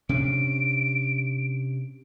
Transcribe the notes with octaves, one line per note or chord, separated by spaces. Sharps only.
C3 C#4 D4 D7